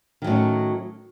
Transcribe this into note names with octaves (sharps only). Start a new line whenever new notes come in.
A2 D#3 F#3 C#4